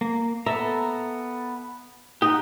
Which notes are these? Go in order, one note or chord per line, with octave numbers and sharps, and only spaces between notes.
A#3
B3 A4 E5 A#5
D#4 G4 F#5